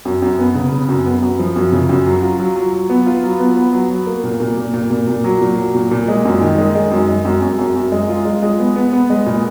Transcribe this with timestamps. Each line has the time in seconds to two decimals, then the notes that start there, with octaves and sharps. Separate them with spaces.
0.05 F#2
0.22 F#2
0.39 B3
0.55 C#3
0.72 C#3
0.88 F#2
1.06 B3
1.22 F#2
1.39 F3
1.56 F#2
1.72 C#3
1.89 F#2
2.06 F#3
2.22 F4
2.39 F#3
2.56 F#3
2.73 F#3
2.90 B3
3.06 F4
3.23 F#3
3.40 B3
3.57 B3
3.73 F#3
3.90 F#3
4.07 A#3
4.24 A#2
4.40 A#2
4.57 A#2
4.74 A#2
4.91 A#2
5.08 A#2
5.24 F#3
5.41 A#2
5.58 F#3
5.75 A#2
5.91 A#2
6.08 G#3
6.25 F#2
6.41 D#3
6.58 G#3
6.75 G#3
6.91 F#2
7.09 G#3
7.25 F#2
7.42 F#2
7.59 F#2
7.76 F#2
7.92 G#3
8.09 F4
8.25 G#3
8.42 G#3
8.59 B3
8.76 B3
8.93 B3
9.10 G#3
9.26 A#2